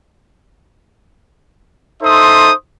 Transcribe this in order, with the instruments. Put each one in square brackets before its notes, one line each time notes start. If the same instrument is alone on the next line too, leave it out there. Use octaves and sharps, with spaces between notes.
[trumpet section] D#4 A4 C5 E5 C6 D#6